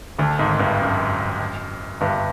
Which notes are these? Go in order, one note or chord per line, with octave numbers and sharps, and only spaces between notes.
D2 D3
G#1 G#2
G1 G2
F#2
G1 G2